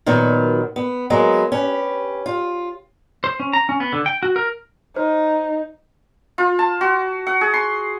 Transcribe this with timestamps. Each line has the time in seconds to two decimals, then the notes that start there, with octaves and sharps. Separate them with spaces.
0.06 A#2 D#3 F#3 B3
0.76 B3
1.10 F#3 G#3 A#3 B3
1.52 C#4 G4 B4
2.26 F4
3.24 C5
3.40 C#4
3.53 A#5
3.69 C#4
3.80 B3
3.93 D3
4.06 G5
4.23 F#4
4.36 A#4
4.96 D#4 C5
6.38 F4
6.59 A5
6.81 F#4
7.27 F#5
7.41 G#4
7.54 C6